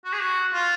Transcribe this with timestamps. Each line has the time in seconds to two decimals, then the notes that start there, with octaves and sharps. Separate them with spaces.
0.05 F#4
0.13 G#4
0.20 F#4
0.54 F4